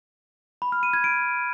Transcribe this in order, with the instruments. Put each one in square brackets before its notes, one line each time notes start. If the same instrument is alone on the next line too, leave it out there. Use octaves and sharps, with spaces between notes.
[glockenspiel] B5
F6
D#7
G#6
D7